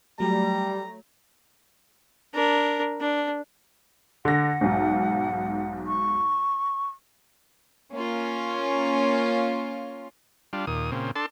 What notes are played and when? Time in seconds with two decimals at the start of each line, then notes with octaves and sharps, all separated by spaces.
0.20 F#3 G3 A3 A#5
2.34 D4 A#4
3.00 D4
4.25 D3 F#5 A#6
4.61 B1 G#2
5.86 C#6
7.92 A#3 C#4 F4
10.53 G3 D4 F4
10.67 D#2 A#2 D#6
10.92 A#2 C#3 C4
11.16 D4 A4 A5 C6